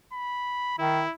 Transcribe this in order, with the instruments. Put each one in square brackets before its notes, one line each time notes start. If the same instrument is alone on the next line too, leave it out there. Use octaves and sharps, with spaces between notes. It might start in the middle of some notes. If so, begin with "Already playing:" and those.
[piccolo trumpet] B5
[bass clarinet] D#3 [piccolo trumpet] E4